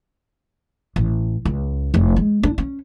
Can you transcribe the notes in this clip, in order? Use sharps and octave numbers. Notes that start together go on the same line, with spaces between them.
A1
C#2
F1
G#3
D4
C#4